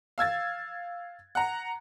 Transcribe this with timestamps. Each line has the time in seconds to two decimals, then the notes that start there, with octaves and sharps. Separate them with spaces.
0.18 F5 E6 G#6 A6
1.35 F#5 A#5